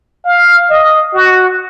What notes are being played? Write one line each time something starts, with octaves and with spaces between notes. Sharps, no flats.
F5
D#5
F#4